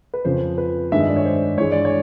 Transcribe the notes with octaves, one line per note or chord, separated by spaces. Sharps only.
B4
F2 C#3 F3 C5
B4
G2 D#3 G#3 E5
D#5
D5
C#5
C5
G2 E3 G#3 C#5
D5
C#5